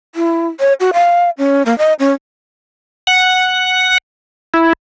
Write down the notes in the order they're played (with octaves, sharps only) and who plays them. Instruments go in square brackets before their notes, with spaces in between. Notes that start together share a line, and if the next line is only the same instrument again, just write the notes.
[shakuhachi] E4
C#5
F#4
F5
C#4
A#3
D#5
C#4
[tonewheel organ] F#5
E4